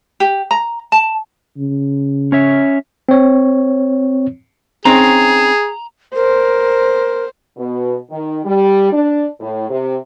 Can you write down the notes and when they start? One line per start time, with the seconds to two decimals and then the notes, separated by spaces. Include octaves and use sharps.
0.20 G4
0.51 A#5
0.92 A5
1.57 C#3
2.32 C#4 C#5 E5
3.09 C4 C#5
4.85 C4 C#4 D#4 G#4 A#5
6.15 A#4 C5
7.57 B2
8.10 D#3
8.44 G3
8.92 D4
9.39 A2
9.69 C3